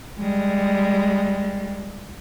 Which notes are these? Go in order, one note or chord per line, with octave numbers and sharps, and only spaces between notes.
G3 G#3